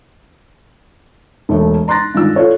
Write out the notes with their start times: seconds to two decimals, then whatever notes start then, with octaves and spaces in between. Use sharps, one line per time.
1.49 E1 A3
1.88 A#5 C6 F#6 A6 A#6
2.14 G2 D3 D#3 G#3 F4 E6
2.35 F4 A4 C#5 D5